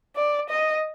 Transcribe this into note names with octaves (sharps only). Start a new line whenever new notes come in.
D5
D#5